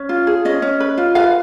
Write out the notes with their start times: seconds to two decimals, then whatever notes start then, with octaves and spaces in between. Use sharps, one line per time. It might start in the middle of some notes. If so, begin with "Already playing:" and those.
Already playing: C#4
0.09 F4
0.27 G#4
0.45 C#4 D#5
0.62 C#4
0.80 B4
0.98 F4
1.15 B4 F5